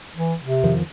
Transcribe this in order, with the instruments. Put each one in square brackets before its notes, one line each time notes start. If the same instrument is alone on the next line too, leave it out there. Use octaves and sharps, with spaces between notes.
[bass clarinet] E3
C3
[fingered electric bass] F2 D#3 F3